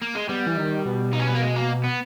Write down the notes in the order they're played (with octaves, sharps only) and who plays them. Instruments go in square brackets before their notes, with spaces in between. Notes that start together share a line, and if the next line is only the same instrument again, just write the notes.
[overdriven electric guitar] A#3
G#3
[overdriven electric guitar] G3 [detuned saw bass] B3
[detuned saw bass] E3
D#3
B2
[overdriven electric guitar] D#4
C#4
B3
A#3
G#3
A#3
B3